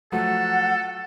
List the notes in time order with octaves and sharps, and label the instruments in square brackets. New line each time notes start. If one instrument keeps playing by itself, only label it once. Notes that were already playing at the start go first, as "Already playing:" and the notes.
[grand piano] F3 F#3 A3 [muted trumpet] A4 [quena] F#5